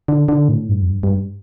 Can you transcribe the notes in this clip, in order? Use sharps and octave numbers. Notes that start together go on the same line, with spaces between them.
D3
D3
A2
G2
F2
G2
G2